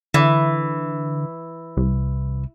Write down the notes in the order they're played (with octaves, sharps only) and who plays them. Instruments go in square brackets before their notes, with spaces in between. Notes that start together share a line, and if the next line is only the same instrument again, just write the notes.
[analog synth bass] D3 [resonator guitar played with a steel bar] E3
[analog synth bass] C2